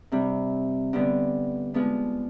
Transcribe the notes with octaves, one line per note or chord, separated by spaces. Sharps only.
C3 G3 D4
D3 G3 B3 D4
F3 G#3 B3 D4